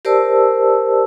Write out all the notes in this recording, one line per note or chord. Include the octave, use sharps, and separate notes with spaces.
G4 A#4 C5 D5 A5 E6